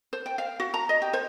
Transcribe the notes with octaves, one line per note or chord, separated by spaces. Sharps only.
C5
G5
F5
F#4
A#5
D#5
G4
C5